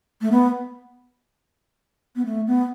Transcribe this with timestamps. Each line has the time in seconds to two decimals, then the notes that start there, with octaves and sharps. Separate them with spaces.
0.21 A3
0.32 B3
2.16 B3
2.26 A3
2.47 B3